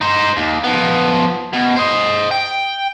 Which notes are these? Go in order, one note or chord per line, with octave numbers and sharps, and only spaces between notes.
D#4 C5
D#2
F3 B3
B2
C5 D#5
G5